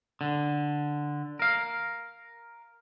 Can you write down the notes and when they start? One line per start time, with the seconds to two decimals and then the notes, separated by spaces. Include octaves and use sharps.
0.21 D3
1.39 A#4 F5